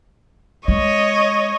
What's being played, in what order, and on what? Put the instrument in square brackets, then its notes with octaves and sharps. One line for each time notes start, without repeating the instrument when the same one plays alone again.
[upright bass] G#3 [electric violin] C#5 D#5